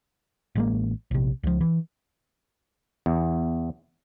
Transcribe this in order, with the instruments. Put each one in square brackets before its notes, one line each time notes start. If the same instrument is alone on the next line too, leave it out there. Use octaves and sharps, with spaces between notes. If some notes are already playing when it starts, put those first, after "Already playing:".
[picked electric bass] A1 G#3 A#3
A#1 C3
C#2 F3
E3
[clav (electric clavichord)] E2